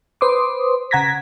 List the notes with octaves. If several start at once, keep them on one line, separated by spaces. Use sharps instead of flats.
B4 C5 C6 D6 D#6
C#3 F#5 A#5 G#6 A#6 B6